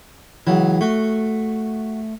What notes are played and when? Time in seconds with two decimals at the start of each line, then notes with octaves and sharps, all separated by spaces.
0.47 C#2 E3 F#3
0.81 A3 F#4